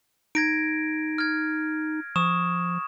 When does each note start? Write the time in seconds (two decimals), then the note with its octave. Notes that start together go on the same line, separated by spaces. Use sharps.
0.35 D#4 G#6 A#6 D7
1.18 F6 G#6
2.16 F3 C#6 D#6 E7